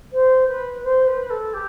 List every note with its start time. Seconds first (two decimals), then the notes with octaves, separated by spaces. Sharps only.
0.12 C5
0.48 B4
0.83 C5
1.07 B4
1.30 A4
1.53 G4